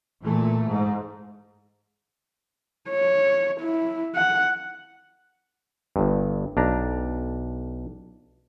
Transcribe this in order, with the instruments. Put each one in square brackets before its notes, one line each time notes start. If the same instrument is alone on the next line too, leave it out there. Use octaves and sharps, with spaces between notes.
[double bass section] A#2 E3 A3
G#2
[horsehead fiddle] C#5
E4
F#5
[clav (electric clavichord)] G1 G2
B1 D4 A#5